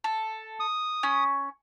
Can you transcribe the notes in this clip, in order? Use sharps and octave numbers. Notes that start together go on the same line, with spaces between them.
A4
D#6
C#4